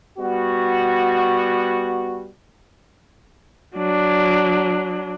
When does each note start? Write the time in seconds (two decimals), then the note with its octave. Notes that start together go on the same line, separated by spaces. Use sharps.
0.18 G3 B3 F#4
3.75 F#3 D4